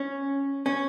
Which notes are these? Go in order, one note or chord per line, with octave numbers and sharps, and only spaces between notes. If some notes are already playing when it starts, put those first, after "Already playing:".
Already playing: C#4
C#4